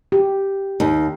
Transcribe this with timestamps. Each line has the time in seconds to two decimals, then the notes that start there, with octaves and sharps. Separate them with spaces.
0.12 G4
0.80 D#2